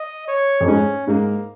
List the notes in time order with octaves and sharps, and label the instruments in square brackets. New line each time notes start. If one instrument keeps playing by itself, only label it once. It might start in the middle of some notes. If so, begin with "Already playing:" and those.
Already playing: [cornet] D#5
C#5
[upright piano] F2
[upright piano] G#2 [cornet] C#4
[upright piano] G#2 [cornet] A#3